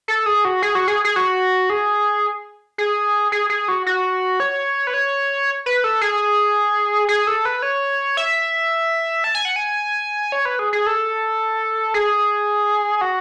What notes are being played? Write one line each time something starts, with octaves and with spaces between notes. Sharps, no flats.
A4
G#4
F#4
G#4
F#4
G#4
G#4
F#4
G#4
G#4
G#4
G#4
F#4
F#4
C#5
B4
C#5
B4
A4
G#4
G#4
A4
B4
C#5
E5
A5
G#5
F#5
G#5
C#5
B4
G#4
G#4
A4
G#4
F#4